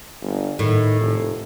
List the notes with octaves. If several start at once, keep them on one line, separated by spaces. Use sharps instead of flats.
G1
A2 D#3
F1